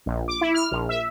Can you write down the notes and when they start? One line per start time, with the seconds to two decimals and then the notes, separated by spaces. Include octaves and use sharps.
0.06 A#1
0.28 D6
0.41 E4
0.54 F6
0.71 A#1
0.89 E5